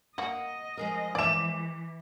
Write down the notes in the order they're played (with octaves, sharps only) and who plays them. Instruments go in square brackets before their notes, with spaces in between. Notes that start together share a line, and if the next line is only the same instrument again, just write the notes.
[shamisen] A#3 F#4 [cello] D#5 [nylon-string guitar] F#5
[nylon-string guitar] F3 G#3 A#4
[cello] E3 [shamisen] D5 E5 [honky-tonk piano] D6 E7